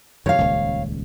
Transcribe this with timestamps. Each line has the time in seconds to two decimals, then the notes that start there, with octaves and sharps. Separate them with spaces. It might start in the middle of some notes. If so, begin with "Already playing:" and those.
0.26 F#2 C3 C#5 F5
0.38 D#1 C#2